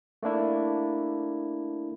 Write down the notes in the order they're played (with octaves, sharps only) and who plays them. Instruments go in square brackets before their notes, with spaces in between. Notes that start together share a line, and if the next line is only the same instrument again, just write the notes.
[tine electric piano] A3 A#3 D4 E4